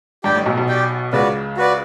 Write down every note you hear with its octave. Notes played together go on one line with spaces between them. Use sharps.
G2 G4 D5 G5
A1 A2
B1 B2
B1 B2
G4 D5 G5
C#2 C#3 F#4 B4 D5
F#4 B4 D5